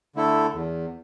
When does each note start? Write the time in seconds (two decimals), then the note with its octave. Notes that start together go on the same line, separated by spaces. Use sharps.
0.16 D3 A3 E4 A4
0.54 E2